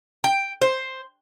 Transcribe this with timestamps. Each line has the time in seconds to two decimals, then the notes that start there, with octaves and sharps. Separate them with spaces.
0.24 G5
0.62 C5